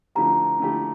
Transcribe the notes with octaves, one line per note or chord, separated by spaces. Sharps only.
D3 F3 A3 E4 G4 A#5
D3 F3 A3 E4 G4